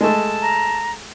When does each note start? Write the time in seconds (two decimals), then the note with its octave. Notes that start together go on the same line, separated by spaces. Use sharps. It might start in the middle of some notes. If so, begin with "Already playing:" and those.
0.01 G#3 A3 A5
0.42 A#5